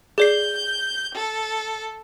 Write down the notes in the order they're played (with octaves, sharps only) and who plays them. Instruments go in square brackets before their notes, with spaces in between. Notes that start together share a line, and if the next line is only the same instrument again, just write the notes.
[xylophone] G#4 D5 C7 [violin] G6
[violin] A4